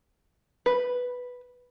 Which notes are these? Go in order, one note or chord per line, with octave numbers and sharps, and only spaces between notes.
B4